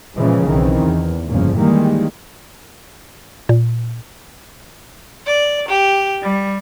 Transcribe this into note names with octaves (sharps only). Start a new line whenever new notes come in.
A#2 C#3 E3 F3 G#3
B1 D#3 E3 C4
E2
G1 F2 A#2 C#3 F3
D#3 E3 G3 G#3 A#3
A#2
D5
G4
G3